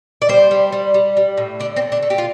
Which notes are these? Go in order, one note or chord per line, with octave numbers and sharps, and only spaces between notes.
D5
G3 C5
G3
G3
G3
G3
A2
D3 D4
C4
A3
D4
A3 A4
G4
F4